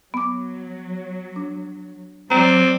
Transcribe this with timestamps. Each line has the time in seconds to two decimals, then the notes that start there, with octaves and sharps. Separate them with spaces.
0.14 F#3 B3 D6
1.36 D4
2.30 F#3 C4 D5 A#5